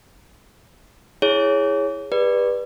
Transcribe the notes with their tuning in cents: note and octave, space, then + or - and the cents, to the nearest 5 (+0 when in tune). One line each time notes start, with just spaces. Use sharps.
E4 +0 G#4 +0 C#5 +0
G4 +35 B4 -15 D5 +15